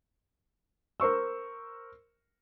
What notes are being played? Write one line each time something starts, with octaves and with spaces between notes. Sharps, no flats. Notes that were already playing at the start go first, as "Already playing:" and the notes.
A#4 C5 C#6 E6